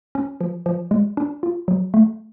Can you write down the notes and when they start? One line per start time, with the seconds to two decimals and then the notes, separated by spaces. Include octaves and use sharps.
0.15 C#4
0.41 F3
0.66 F3
0.91 G#3
1.17 D4
1.43 F4
1.68 F#3
1.94 A3